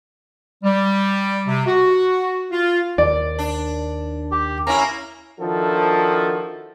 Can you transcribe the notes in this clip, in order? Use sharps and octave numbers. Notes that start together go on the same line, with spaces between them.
G3
C3
F#4
F4
D#2 D5
D4
G4
A#3 C#4 E4 A#5
D#3 F3 D4 E4 F#4 A4